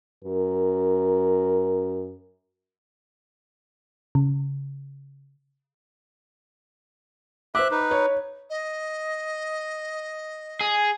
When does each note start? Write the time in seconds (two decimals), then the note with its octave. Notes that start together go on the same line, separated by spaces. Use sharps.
0.24 F#2 A#4
4.15 C#3
7.55 C5 E5 D6 F#6
7.71 D#4 B4
7.91 C#5
8.50 D#5
10.61 G#4